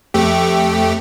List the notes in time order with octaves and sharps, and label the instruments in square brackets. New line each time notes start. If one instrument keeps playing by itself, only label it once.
[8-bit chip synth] F2 A3 G4